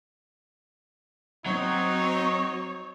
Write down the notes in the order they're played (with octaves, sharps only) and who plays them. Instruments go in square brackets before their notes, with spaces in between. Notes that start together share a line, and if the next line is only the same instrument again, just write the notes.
[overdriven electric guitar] F#3 [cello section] C4 [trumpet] D#4 [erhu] C#5